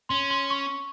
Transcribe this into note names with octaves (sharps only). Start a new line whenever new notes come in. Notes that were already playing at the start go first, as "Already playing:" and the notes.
C#4 C6
C6
C#6